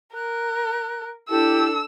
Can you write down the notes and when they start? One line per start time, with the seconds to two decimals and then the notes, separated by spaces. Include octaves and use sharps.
0.15 A#4 F#6
1.30 D4 E4 G4 A4 E6